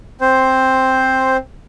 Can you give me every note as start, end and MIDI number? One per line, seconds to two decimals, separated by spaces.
0.21 1.37 60
0.21 1.37 72